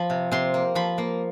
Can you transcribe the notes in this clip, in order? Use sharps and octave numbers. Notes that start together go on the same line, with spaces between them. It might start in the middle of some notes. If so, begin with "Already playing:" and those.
Already playing: F3 B5
C3
C3 C6
A#3
F3 B5
A#3